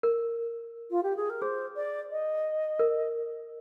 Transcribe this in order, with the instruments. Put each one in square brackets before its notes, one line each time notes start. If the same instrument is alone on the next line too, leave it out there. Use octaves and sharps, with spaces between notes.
[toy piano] A#4
[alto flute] F4
G4
G#4
A#4
[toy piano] G#4 [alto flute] C5
[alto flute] D5
D#5
[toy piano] A#4